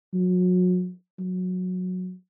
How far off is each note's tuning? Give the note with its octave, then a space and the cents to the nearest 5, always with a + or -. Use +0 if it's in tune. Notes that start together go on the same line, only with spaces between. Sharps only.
F#3 -35
F#3 -15